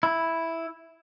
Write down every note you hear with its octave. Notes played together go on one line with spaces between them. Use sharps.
E4